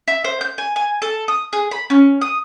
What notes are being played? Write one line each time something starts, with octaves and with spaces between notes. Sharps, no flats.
E5
C5
G6
G#5
G#5
A4
D#6
G#4
B5
C#4
D#6